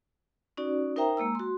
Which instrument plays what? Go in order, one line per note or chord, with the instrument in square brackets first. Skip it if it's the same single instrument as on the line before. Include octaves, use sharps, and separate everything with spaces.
[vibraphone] C#4 D#4 F#4 D5
D#4 A#4 C5 E5 G5 A#5
G#3 A#3 A#5 E6
F#4 C6